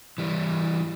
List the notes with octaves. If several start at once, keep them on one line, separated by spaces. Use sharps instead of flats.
E3 G3